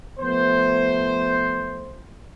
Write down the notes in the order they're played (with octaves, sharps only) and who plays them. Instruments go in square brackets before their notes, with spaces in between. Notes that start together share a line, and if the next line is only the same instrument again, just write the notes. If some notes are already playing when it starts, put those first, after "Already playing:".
[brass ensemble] F3 A3 B3 C5